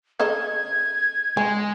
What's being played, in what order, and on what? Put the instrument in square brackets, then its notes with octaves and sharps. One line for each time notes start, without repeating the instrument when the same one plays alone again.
[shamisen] C#3 A4 D#5 [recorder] G#6
[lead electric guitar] G#3 [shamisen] G#5